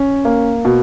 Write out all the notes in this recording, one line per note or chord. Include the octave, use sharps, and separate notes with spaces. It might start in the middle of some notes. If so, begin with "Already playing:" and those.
Already playing: C#4
A#3
B2